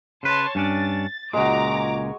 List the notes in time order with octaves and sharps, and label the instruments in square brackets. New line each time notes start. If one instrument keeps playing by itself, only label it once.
[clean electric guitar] C#3 B4 [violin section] C#5 A5 C6
[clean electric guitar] G2 C#4 D4 [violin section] A6
[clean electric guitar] C#2 A#2 [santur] G#3 F#4 [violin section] A#5 D6
[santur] G#5 C#6